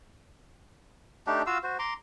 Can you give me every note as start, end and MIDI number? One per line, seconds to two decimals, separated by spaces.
1.27 1.43 57
1.27 1.43 62
1.27 1.43 63
1.27 1.43 67
1.46 1.58 65
1.46 1.58 66
1.46 1.58 77
1.46 1.58 88
1.63 1.78 66
1.63 1.78 72
1.79 1.94 82
1.79 1.94 84
1.79 1.94 86